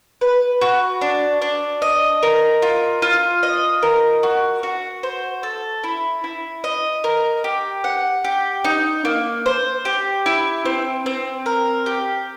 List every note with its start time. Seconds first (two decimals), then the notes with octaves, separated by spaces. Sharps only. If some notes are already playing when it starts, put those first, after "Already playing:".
0.21 B4
0.61 F#4
1.01 D4
1.42 D4
1.82 D#5
2.23 A#4
2.62 F4
3.02 F4
3.43 D#5
3.83 A#4
4.23 F#4
4.63 F#4
5.03 C5
5.43 A4
5.84 E4
6.24 E4
6.64 D#5
7.04 A#4
7.44 G4
7.84 F#5
8.24 G4
8.64 D#4
9.05 A#3
9.46 C5
9.85 G4
10.26 E4
10.65 C4
11.06 C4
11.46 A#4
11.86 G4